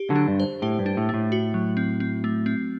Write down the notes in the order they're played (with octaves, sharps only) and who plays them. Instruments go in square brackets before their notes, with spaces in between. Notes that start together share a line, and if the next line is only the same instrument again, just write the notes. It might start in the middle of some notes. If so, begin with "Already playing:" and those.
Already playing: [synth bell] G4
[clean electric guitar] D3 F#3
[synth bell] D4
[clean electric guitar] G2
[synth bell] C5
[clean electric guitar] A2 [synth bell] G4
[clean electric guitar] G2
[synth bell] D4
[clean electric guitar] A2
[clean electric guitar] A2 [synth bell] A3
[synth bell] F#4
F#3
C4
C4
A3
C4